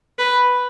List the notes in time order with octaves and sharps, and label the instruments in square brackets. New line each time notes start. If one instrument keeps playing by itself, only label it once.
[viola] B4